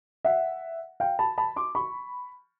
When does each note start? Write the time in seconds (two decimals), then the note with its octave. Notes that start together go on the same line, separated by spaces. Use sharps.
0.25 E5 F#5
1.00 F5 G5
1.19 A5 B5
1.38 A5 B5
1.56 C6 D6
1.75 B5 C#6